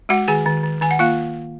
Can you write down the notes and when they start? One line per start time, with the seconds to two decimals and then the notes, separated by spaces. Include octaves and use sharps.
0.09 G#3 F#4 F#5
0.28 D#3 G#4 G#5
0.46 D#3
0.63 D#3
0.81 D#3 G#5
0.91 F#5
0.99 A#3 F4 F5